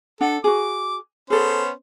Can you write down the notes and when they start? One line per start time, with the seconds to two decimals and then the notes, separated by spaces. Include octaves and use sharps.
0.21 D4 A4 F#5
0.44 F#4 G#4 D6
1.30 B3 C#4 G#4 A4 C5